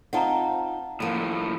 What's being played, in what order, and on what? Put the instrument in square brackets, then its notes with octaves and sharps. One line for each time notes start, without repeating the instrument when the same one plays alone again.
[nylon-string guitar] C4 D#4 F4 [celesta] F#5 A5 A#5
[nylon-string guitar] E2 A#3 [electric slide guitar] A2 F3